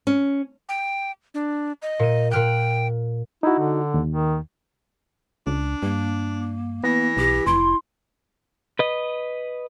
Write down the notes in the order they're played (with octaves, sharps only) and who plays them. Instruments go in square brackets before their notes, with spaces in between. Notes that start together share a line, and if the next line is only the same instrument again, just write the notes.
[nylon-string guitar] C#4
[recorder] G5
D4
D#5
[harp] A#2 D#7
[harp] A#2 F6 F#6 [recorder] G5
[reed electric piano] D#4 F#4 [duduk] E4
[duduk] D3
[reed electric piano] D#2
[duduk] D#3
[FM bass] C#2 [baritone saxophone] D4
[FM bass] G2 [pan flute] A#3
[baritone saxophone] E3 [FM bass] B3 [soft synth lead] A#6
[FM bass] B1 [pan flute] G4
[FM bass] F1 [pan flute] E4 [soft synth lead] C6
[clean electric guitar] B4 D#5